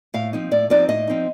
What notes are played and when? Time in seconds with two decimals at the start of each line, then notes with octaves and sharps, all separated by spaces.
0.14 A2 F5
0.33 F3 C4 D#4
0.51 A2 D5
0.70 F3 C4 D#4 D5
0.89 A2 D#5
1.07 F3 C4 D#4